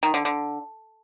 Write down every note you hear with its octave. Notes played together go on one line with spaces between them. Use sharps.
D#3
D3
D3